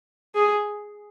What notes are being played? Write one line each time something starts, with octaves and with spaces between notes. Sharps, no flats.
G#4